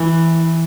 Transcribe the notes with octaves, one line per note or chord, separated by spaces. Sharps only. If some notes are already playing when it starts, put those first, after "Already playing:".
Already playing: E3